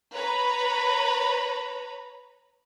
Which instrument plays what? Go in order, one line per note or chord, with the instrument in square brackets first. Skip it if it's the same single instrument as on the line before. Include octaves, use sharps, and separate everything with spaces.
[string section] B4 C#5 A#5 B5